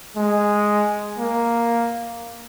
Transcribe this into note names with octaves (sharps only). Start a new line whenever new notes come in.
G#3
A#3